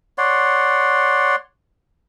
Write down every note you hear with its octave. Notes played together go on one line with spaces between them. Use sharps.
C#5 D5 F#5 C6